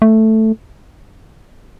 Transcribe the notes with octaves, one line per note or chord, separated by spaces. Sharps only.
A3